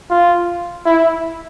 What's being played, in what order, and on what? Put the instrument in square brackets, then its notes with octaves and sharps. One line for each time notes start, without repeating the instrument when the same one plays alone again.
[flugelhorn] F4
E4